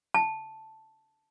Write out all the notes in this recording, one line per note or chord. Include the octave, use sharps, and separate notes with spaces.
A5